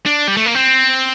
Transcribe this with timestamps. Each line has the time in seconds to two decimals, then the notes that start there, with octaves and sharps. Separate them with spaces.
0.06 D4
0.28 G3
0.37 A3
0.46 A#3
0.55 C4